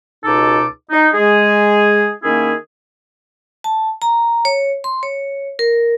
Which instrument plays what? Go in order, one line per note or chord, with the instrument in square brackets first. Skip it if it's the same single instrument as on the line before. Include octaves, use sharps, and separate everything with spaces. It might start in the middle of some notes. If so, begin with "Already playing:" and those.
[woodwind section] C#2 B2 D#4 A4 D6
D#4
G#3 G#4
D#3 A#3 C#4 E4 G#4
[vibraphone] A5
A#5
C#5
C6
C#5
A#4